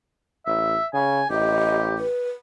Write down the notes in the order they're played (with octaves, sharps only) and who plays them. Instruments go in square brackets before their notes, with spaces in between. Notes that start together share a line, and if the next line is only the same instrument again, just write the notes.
[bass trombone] A1 [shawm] E5
[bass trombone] C#3 [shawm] G#5
[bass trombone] A1 [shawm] G4 [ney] D#5
[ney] B4